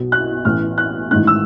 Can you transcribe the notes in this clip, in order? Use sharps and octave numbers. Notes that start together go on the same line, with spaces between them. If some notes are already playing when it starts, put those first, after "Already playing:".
Already playing: B1 B2
F#6
A1 A2 E3 F6
F#6
A1 G#2 D#3 F#6
E6